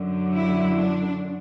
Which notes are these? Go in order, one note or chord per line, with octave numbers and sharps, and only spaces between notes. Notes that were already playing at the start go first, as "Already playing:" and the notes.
Already playing: F#2 D3 F#3
E4
D4